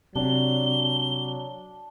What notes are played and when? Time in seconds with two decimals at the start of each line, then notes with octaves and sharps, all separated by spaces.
0.15 C3 F#3 D4 G7